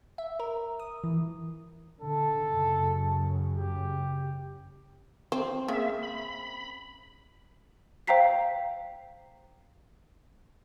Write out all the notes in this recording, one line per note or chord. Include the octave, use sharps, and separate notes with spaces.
E5
A#4
D#6
E3
D3 A4
F#2 C#3
G4
C4 C5
C#3 A#3 E5
B5
C5 F5 G5 A#5 B6 C7